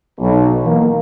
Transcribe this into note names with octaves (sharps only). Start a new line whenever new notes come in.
B1
E3 A#3